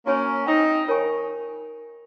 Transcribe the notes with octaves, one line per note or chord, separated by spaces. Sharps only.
A#3 C#4 F#4 C#5 G#5
C4 D#4
F4 A#4 C#5 G#5 C#6